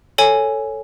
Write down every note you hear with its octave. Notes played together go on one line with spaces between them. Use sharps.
A4 C#5 G#5